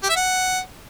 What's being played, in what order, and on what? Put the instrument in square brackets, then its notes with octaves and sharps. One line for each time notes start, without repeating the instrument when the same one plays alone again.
[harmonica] G4
E5
F#5